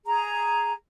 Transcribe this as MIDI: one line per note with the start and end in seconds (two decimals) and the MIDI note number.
0.06 0.72 68
0.06 0.72 82